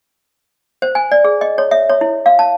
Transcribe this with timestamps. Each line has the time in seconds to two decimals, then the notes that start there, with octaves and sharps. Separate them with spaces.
0.82 C5
0.95 G#5
1.12 D5
1.25 G#4
1.41 D#5
1.58 C#5
1.71 E5
1.90 C#5
2.01 E4
2.26 F5
2.39 A5